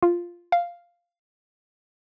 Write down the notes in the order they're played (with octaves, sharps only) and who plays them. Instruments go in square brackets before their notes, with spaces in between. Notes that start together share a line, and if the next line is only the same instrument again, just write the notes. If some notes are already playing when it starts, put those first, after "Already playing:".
[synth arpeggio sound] F4
F5